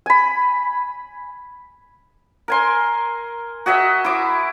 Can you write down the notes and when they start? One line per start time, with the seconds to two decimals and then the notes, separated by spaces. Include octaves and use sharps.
0.06 G#5 B5
2.48 A#4 G#5 C6
3.66 F#4 G#4 D#5 E5
4.04 E4 D6